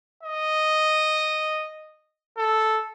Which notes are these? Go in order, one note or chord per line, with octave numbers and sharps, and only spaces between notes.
D#5
A4